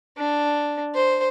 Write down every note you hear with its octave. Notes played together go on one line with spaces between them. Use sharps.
D4
C5